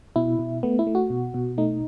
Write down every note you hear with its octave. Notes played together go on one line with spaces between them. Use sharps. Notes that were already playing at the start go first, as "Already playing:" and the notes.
B2 E4
B2
A3 B3
E4
A3
F#4
B2
B2
A3 D#4